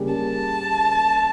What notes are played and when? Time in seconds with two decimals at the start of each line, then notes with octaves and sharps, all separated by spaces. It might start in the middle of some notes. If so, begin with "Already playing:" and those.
Already playing: C#3 G3 A#3 C#4 G4
0.14 A5